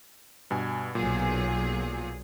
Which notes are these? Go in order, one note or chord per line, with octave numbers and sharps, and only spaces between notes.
G2 B2 G#5
B1 A#2 F#3 G#4